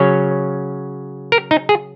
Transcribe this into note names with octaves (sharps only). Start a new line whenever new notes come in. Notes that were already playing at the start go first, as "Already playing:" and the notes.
Already playing: C#3 F#3 C#4 C#5
A#4
D#4
G#4